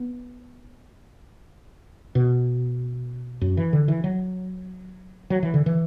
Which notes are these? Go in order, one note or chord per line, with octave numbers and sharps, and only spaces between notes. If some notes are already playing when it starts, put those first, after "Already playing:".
Already playing: B3
B2
F#2
E3
D3
E3
F#3
F#3
E3
D3
E3